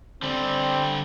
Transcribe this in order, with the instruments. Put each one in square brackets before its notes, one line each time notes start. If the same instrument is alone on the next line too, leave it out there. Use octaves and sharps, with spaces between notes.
[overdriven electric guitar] D3 G3 [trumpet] C4